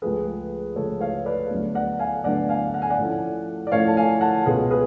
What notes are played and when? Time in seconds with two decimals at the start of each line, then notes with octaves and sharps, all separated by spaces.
0.02 C#2 C#3 F3 A3 G#4 B4
0.76 C#2 C#3 F3 A3 A4 C#5
1.00 C#5 F5
1.26 B4 D5
1.50 D2 D3 F#3 B3 D4
1.75 D5 F#5
1.99 F5 G#5
2.24 D2 D3 F#3 B3 D4 D5 F#5
2.49 F5 G#5
2.74 F#5
2.82 G#5
2.90 D5 F#5
2.98 A2 F3 A3 C#4
3.67 D5
3.72 A2 F3 A3 C#4 C#5 F5
3.87 A5
3.97 F5 G#5
4.21 F#5 A5
4.45 C#2 B2 G#3 C#4 F4 G#4 B4
4.71 G#4 B4